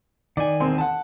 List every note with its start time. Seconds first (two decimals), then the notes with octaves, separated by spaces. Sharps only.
0.37 D#3 D#4 D5 G#5
0.60 E1 C4 C6
0.78 F#5 A5